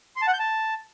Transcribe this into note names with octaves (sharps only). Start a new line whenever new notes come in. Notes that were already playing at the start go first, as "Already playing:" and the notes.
C6
A5
F#5
G6
A5